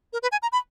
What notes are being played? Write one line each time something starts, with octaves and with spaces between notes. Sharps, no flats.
A#4
B4
G#5
A#5
B5